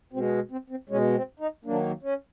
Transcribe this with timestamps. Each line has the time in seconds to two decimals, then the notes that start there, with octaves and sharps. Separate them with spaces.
0.13 B2 C4
0.17 G#3
0.51 C4
0.70 C4
0.89 B2 G#3 C#4
1.15 C4
1.40 D#4
1.65 D#3 F#3 A#3 D4
2.02 C#4